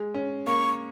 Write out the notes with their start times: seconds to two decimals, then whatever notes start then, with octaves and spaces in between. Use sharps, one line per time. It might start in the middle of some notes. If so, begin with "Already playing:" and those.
Already playing: G#3
0.14 C#4
0.47 A#3 C#6